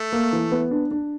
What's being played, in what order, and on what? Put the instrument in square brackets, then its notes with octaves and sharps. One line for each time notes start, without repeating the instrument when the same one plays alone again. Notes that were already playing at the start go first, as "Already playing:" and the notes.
Already playing: [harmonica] A3
[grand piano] A#3
E3
B3
D4
D4